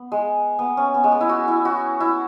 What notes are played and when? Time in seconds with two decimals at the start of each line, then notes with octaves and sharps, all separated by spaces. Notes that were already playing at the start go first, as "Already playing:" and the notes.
Already playing: B3
0.12 G#3
0.59 B3
0.77 C#4
0.94 B3
1.04 G#3
1.12 B3
1.21 E4
1.29 F#4
1.48 E4
1.65 F#4
2.00 E4